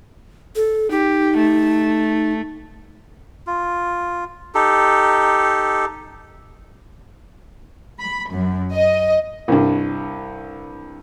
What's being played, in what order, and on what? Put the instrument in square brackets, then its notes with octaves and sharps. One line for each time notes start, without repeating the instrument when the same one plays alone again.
[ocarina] A4
[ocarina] D#4 [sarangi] G4
[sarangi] A3
[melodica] F4
D#4 G4 A4
[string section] B5
F#2
D#5
[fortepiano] C2 G2